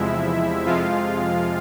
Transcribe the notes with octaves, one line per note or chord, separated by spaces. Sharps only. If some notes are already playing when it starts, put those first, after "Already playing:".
Already playing: E2 C3 F3 G#3 E4 E5
F2 C3 F3 G#3 F4 F5